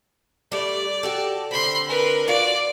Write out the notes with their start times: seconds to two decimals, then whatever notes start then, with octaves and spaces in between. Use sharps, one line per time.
0.52 G3 A3 D5
1.03 F#4 G4 A4
1.51 D3 C4 B5 C6
1.87 A#4 B4
2.28 F4 F#4 D5